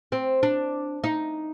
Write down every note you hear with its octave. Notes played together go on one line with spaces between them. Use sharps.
C4
D4
D#4